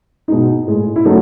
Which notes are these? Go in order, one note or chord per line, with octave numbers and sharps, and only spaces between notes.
B2 G#3 D#4
A2 G#3
E4
C#3 F#3 A3 D#4